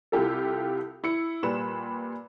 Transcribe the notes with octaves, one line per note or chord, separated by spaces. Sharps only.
C2 E4 F4 G4 A4
E4 C#7
A#2 G3 B4 B5 E7